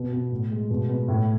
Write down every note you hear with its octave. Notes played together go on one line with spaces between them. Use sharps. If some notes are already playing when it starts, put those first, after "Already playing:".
Already playing: B2
B3
A2
G#3
B2
B3
A2